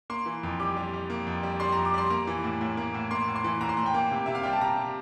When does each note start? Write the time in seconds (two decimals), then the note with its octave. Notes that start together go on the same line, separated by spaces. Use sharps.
0.10 A#3 C6
0.26 E3
0.43 F2
0.60 G3 D6
0.77 G3
0.93 G3
1.10 A#3
1.27 F2
1.43 G3
1.60 G3 C6
1.72 F2 A#5
1.85 D6
1.94 G3 C6
2.10 A#3 A#5
2.27 E3
2.44 A2
2.61 A2
2.77 A#3
2.94 A2
3.11 A#3 C6
3.28 A2
3.36 C6
3.44 E3
3.61 A2 A#5
3.69 C6
3.77 A2 A#5
3.86 G5
3.94 A#3
4.11 C3
4.26 C3 E5
4.35 F5
4.43 G3 G5
4.53 A5
4.61 C3 A#5
4.78 C3